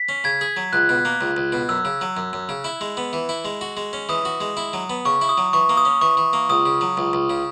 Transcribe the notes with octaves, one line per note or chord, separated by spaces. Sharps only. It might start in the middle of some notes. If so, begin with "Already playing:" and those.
Already playing: B6
C#4
C#3 G#6
G#4
F#3
C#2 F#6
B2
A#3
C#2
C#2
B2
F#2 E6
C#3
F#3
F#2
F#2
C#3
E4
G#3
B3
E3
E4
G#3
F#4
G#3
C#4
E3 D#6
F#4
G#3
E4
F#3
B3
C#3 C#6
E4
D#6
F#3
E3 C#6
A#3
D#6
C#4
E3 C#6
E3
A#3
C#2 D#6
C#3
F#3
C#2
C#2
C#3